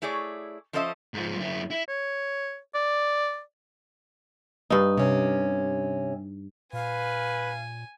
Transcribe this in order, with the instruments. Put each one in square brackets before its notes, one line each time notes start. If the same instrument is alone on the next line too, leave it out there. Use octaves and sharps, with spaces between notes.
[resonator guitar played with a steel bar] A3 E4 G#4 C#5 D5
F3 C#4 A4 C5 D#5 E5
[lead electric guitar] G#2 F3
F#2 E4
E4
[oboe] C#5
D5
[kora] G2 D#4
[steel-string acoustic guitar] C3 C#4
[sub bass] A#2 [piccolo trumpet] B4 [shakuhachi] F5 [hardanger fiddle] G#5